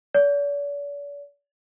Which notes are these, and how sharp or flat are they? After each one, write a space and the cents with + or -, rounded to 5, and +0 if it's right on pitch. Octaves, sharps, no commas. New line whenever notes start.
D5 -45